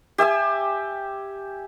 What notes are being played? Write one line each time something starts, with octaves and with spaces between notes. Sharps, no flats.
G4 E5 G#5 E6